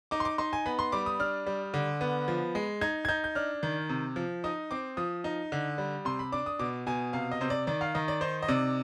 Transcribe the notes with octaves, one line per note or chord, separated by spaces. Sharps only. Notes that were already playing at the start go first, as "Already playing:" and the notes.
D#4 D6
C6
D6
D#4 C6
G#5
B3 B5
C6
G3 D6
D#6
D4 F6
G3
D3
B3
F3
G#3
D#4 G#6
G#6
D#4 G6
G6
D4 F6
D#3
C3
F3
D#4 D#6
C4 D6
F3 D#6
D#4
D3
G3
C3 C6
B5
D4 D6
D#6
B2 D6
B2 G#5
C3 F5
D#5
C3 C5
D5
D#3 D5
F5
D#3 D#5
D5
D#4 C5
D#5
C3 D5